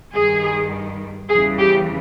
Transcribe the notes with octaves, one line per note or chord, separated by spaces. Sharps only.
G2 D#3 G3 G#4
E2 C#3 E3 G3 G#4
G4